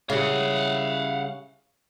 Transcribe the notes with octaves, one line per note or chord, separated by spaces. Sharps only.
C#3 G3 E4 F5 F#5